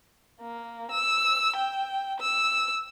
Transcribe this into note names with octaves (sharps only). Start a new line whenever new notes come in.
A#3
E6
G5
E6